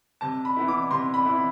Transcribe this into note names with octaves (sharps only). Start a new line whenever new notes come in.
C3 A5
B5
E3 B3 E4
D6
C3 C6
B5
E3 B3 E4